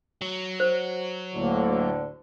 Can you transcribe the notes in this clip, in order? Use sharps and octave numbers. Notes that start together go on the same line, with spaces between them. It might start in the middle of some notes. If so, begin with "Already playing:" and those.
F#3
C5
D2 A2 D3 A#3